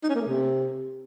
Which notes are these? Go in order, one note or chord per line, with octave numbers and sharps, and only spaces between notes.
D#4
C#4
A#3
A3
C3